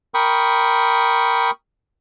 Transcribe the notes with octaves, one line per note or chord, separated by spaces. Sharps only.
A#4 G5 B5 C#6 D#6